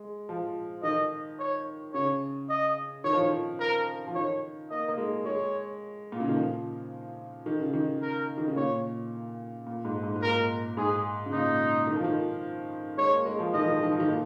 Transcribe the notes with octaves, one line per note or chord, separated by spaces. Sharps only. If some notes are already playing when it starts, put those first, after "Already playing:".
Already playing: G#3
F3
D#3 D#5
C#5
C#3 C#5
D#5
D#3 C#5
F3
D#3
A#4
F3
D#3 C#5
A#3 D#5
A#3
G#3
G#3 C#5
A#2
C#3
D#3
F3
D#3
C#3
D#3
A#4
D#3
C#3
A#2 C#5
A#2
G#2
G#2
G#2
A#2 A#4
G#2 G#4
C#3
A#2 D#4
D#3
F3
D#3
G#3 C#5
A#3
G#3
F3
D#3 D#5
F3
D#3
F3
D#3
F3
D#3
A#2